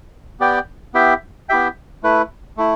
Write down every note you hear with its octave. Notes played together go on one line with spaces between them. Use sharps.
B3 G4 D5 G5
B3 E4 G4 E5 G5
B3 E4 G4 E5 G5
A3 E4 B4
A3 E4